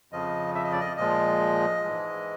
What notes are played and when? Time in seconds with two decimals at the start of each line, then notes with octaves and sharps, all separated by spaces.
0.12 F2 C#3 F3 D#5
0.55 E5
0.64 D#5
0.72 D5
0.80 D#5
0.97 A#2 F3 G#3 D#5
1.84 G#2 E3 G#3